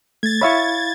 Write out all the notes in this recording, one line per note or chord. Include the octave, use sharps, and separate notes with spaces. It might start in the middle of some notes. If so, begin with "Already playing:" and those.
A3 G#6 A6
E4 C#5 E5 F5 B5 C#6